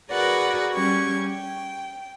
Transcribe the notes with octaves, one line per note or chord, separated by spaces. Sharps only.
F#4 G#4 A#4 B4 D5 F#5
G3 C#4 G4 C#6 G#6
G5